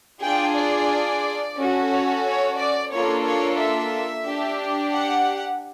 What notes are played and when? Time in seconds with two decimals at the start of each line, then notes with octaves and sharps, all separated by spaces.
0.23 D4 F4 G#4 G5
0.57 D5
1.57 C#4 F#4 A4
1.91 C#5
2.25 C#5
2.59 D5
2.92 A#3 D4 F4 A4 C#5
3.26 C#5
3.60 E5
4.28 D4 G4
4.94 F#5